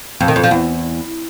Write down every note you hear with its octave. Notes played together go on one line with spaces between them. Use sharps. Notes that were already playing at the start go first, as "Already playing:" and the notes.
F2
D#3
F2
F3
E2